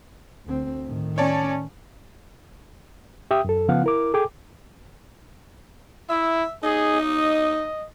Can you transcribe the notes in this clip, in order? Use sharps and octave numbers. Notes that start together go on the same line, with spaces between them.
D2 C4
A2 D#3
C#4 C#5 D5 A5
G4 E5 G5 D#6
F#2 A4
C#3 F3 B3 F5 F#5
E4 A#4 D6
G#4 A4 G5 G#5 D6
E4 E5
D#4 G#4
D#5